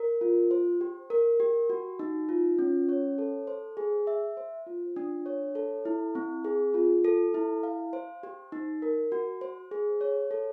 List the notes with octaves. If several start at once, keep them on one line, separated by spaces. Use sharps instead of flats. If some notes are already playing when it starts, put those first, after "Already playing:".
Already playing: A#4
F4
C5
G4
A#4
G4
F#4
D#4
F4
C#4
C#5
A4
C5
G#4
E5
C5
F4
D4
C#5
A4
E4
C4
G#4
F4
A4
E4
F5
C5
G4
D#4
A#4
F#4
C5
G#4
C#5
A4